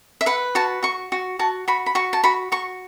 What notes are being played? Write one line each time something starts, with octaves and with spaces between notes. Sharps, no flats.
E5
B4 F#5
F#4 A5
F#4 C#6
F#4
F#4 A5
F#4 B5
B5
F#4 C#6
A5
F#4 B5
F#4 C#6